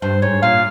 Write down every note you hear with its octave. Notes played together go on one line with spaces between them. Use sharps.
G2 C5
G#2 C#5
A#2 F5